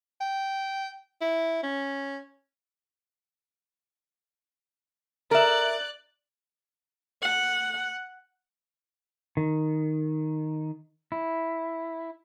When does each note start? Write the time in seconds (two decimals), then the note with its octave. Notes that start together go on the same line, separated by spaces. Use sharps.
0.20 G5
1.21 E4
1.63 C#4
5.31 A#4 D5 E5 F#6
7.22 F#5
9.37 D#3
11.12 E4